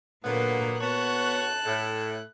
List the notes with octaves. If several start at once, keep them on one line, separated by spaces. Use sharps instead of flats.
A#2 D3 F#3 A#3 B3
B3 F#4 C#5 A5 F#6
A2